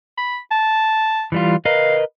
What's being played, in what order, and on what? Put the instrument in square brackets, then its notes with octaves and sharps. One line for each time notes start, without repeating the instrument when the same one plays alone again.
[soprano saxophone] B5
A5
[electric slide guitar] E3 G3 F4
[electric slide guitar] A#4 B4 D#5 [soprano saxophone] F5